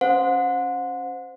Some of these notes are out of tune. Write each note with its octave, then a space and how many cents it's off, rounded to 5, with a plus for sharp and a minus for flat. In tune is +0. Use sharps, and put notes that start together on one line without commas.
C#4 -10 C5 -10 F#5 -40